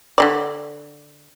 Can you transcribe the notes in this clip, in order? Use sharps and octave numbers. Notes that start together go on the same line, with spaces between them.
D3 D#3 D5